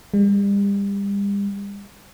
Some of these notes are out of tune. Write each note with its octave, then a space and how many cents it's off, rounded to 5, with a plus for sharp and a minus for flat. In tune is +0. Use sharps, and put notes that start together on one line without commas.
G3 +40